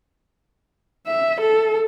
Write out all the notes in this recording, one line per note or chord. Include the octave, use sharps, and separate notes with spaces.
E5
A4